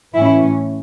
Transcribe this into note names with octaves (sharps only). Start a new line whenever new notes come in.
A2 E3 C#4 E4